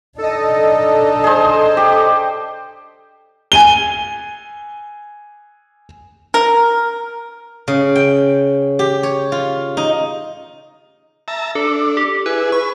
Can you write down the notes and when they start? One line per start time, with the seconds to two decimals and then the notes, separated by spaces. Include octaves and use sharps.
0.18 D4 D#4 A4 D#5
1.24 G#4 C5
1.77 G4
3.52 G#5 D#7 G7
6.34 A#4
7.68 C#3
7.96 G5
8.79 G4
9.03 C#5
9.32 F4
9.77 D#4
11.28 E5 A5 A#5
11.55 D4 A4
11.97 G4
12.26 E4 G#4 B4
12.52 B4 C#6